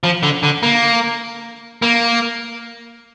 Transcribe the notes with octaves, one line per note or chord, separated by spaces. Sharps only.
F3
D3
D3
A#3
A#3